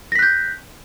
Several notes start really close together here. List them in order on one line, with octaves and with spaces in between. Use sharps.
A#6 B6 F#6 G6